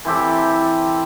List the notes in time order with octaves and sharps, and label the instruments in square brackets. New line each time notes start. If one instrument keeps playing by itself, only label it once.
[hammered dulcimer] E3 C4 G4 A4